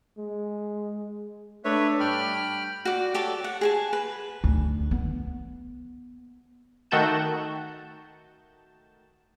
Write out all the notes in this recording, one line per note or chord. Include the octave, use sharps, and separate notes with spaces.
G#3
A3 D4 B4 C#5 E5
G2 G5 B5 F6
F#4 D5
G4 A4 C#5 D5
F#5
G#4 G#5 A5
B4
D2
B3
D#3 A3 F#4 A5 G6 E7